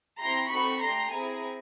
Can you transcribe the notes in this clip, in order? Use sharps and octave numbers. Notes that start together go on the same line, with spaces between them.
C4 E4 G4 A#5 C6
C4 D#4 F#4 A4 B5 C#6
A3 D4 G4 A#5 C6
C4 E4 G#4 G#5 A#5